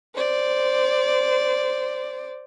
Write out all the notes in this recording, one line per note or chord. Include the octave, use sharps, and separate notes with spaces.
C5 D5